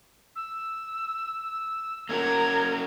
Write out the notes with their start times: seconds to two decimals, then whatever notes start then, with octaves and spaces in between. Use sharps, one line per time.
0.36 E6
2.09 A#3 C#4 F#4 A#4 A#5 G#6